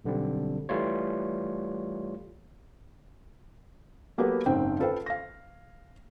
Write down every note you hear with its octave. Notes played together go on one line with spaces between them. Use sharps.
B1 D3 G3 C4
E3 G3 A3 F4 C#5
F#3 A#3 B3 G4 A4 B4
F#1 G#2 C4 G5
F4 A4 B4 C5 F5 G5
F5 A#6